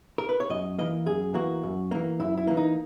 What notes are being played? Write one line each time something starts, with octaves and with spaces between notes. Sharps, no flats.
A#4
B4
C#5
F#2 D#5
E3 A#3 D#5
F#2 G#4
E3 A#3 F#4
F#2
E3 A#3
F#2 E4
E4
E3 A#3
D#4